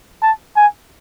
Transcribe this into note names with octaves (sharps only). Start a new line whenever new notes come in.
A5
G#5